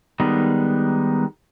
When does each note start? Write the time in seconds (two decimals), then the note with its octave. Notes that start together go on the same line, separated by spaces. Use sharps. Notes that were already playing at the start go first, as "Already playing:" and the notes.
0.20 D#3 G3 G#3 B3 D#4